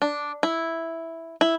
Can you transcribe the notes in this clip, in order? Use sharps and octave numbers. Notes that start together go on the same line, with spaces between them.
D4
E4
E4